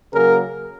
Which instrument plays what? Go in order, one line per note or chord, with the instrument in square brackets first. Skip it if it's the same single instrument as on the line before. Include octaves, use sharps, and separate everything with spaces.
[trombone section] C#3 F#3 A#3 G#4 A#4